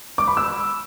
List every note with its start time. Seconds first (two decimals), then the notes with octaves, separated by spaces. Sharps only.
0.18 D6
0.28 B5
0.37 E6